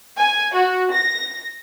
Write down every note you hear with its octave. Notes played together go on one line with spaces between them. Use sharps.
G#5
F#4
A#6